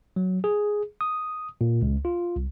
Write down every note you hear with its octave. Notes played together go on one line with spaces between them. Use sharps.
F#3
G#4
D#6
A#2
C#2
F4
C2